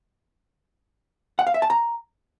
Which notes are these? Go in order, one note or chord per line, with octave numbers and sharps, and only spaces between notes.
F#5
F5
E5
A5
A#5